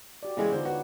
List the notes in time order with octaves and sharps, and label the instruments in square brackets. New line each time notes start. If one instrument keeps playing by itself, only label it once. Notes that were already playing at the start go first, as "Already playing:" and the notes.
[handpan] F#4 G4 D5
[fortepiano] C#3 E3 G#3 [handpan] B3
[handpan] D3 D#4 F4 [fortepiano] C5
[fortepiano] F#4 [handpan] B4 C#5